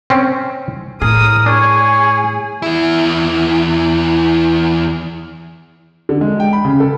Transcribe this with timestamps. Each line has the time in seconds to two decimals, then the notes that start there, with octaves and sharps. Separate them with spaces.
0.10 C4 C#4
1.02 A2 G#4 A#4 D#6
1.46 D4 G#4 C#5
2.62 E2 E4
6.09 D3
6.21 G#3
6.40 G5
6.53 B5
6.65 C#3
6.80 A4